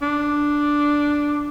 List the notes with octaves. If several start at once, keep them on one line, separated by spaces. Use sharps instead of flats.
D4